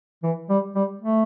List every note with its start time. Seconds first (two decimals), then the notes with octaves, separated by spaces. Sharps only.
0.23 E3
0.49 G3
0.75 G3
1.01 A3